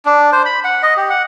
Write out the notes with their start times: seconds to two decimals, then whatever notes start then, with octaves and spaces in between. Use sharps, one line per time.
0.05 D4
0.33 C5
0.45 B5
0.64 F#5
0.83 D#5
0.97 G4
1.10 F#5